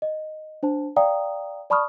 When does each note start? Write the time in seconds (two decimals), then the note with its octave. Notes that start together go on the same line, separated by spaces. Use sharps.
0.02 D#5
0.63 D4 C5 A5
0.96 D5 F5 G5 A#5 D#6
1.70 D5 A5 B5 C#6 D#6 F6